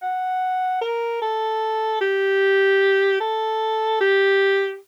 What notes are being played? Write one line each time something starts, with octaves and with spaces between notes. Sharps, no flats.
F#5
A#4
A4
G4
A4
G4